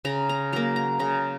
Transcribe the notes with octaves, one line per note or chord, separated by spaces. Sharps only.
C#3 A#5
A#5
F#3 A#3 A#5
A#5
C#3 A#5